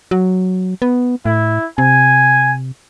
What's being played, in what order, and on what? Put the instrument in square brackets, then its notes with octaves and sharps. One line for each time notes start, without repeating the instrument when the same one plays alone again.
[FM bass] F#3
B3
[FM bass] A2 [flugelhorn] E4
[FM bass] C3 [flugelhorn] G#5